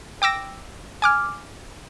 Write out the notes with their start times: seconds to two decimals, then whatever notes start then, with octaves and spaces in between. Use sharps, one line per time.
0.22 G5 D6 E6 A#6
1.02 G#5 D6 F6